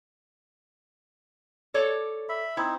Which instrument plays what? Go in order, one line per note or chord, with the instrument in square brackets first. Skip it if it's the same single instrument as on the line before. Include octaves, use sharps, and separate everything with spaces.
[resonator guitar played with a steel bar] A4 C#5 D5
[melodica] E5 B5
[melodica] C4 D#4 [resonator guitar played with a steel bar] E4